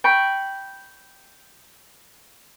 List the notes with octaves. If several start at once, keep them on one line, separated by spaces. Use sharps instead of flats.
G5 B5 C#6